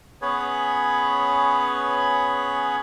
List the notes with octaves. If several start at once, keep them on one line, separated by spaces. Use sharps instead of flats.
B3 C#4 G#4 B4 C#5